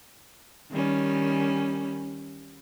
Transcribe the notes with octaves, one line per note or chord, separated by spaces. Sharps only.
D#3 G3 C#4